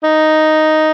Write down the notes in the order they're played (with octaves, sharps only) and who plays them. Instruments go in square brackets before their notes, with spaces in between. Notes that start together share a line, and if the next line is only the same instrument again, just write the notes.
[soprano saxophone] D#4